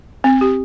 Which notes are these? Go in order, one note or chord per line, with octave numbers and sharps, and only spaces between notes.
C4
G4